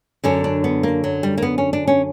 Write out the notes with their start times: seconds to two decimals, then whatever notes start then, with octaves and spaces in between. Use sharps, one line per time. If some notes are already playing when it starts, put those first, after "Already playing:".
0.24 F#2 D3 C#4
0.44 D4
0.64 B3
0.83 A#3
1.04 F#3
1.23 G3
1.38 A#3
1.42 B3
1.58 C#4
1.73 D4
1.87 C#4